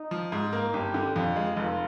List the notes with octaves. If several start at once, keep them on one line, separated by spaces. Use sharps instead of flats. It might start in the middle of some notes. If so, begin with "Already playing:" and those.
Already playing: D#4
F3
G#2 D#4
A#3
G1 G4
D3
F2 F4
G#3
F1 F4